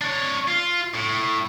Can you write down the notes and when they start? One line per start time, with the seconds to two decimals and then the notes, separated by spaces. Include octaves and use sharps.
0.02 D4 C#5
0.48 F4
0.94 A2